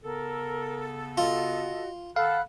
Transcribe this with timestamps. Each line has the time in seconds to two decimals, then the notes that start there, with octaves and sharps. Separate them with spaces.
0.04 C#3 B3 A4 A#4
1.18 F4 F#4 D#5
2.16 D#3 A4 F5 F#5 B5 F#6